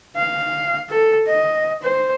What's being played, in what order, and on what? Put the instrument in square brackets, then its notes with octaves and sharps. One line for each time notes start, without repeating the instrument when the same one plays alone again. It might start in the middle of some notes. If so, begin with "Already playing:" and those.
[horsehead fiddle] F5
A4
D#5
C5